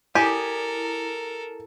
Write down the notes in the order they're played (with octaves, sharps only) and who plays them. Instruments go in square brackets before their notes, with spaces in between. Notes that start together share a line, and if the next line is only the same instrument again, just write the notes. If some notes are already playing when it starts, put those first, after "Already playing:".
[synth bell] E4 [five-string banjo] G4 [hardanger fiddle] A4 A#4 [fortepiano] G#5